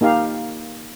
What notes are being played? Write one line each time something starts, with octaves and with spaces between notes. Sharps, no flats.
A#3 D#4 G4 F5